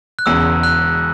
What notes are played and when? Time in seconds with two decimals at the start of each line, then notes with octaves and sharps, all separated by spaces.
0.19 F#6
0.26 E1 E2 C#3 E6
0.63 F#6